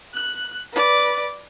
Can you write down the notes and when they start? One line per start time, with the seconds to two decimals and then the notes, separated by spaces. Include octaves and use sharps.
0.14 F#6
0.73 B4 D5